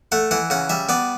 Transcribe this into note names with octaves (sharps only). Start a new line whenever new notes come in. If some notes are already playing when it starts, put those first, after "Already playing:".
A3 F#5
E3 F#5
C#3 F#5
G3 E5
B3 D5